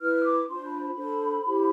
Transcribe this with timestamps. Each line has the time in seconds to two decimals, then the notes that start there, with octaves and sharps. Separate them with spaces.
0.01 E4 B4 F6
0.24 D6
0.48 D4 F4 C5 C6
0.65 B5
0.81 B5
0.97 D4 A4 C5
1.45 E4 G4 C5